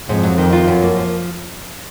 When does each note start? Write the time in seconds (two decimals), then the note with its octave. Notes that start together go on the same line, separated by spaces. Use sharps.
0.09 F2 G#2
0.23 F#3
0.38 D#3
0.53 F4
0.67 F#2
0.82 A#3
0.97 F3